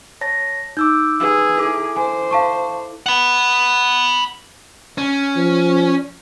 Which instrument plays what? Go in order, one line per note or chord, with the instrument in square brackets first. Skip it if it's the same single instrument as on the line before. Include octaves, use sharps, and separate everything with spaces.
[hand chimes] C#5 A5 A#6
[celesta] D#4 [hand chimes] D6 E6 G6
[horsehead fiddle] G#4 [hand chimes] B4 E6
[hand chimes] E4 A4 D6
[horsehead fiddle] C5 [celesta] G#5
[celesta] F5 A5 C#6
[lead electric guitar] F#5 B5
C#4
[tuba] F3